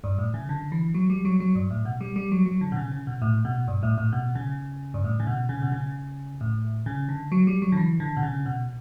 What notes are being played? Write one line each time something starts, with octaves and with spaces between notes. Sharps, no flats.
G2
A2
C#3
D3
E3
F#3
G3
F#3
F#3
G2
A2
B2
G3
G3
F#3
F#3
D3
B2
C#3
C#3
B2
A2
B2
G2
A2
A2
B2
C#3
G2
A2
C#3
B2
C#3
B2
C#3
A2
C#3
D3
F#3
G3
F#3
D3
E3
D3
B2
C#3
B2